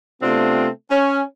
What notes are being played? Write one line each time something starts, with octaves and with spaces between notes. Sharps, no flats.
C3 A3 B3 C4 D4 F4
C#4